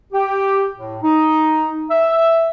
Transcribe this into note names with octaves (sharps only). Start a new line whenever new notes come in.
G4
A2
D#4
E5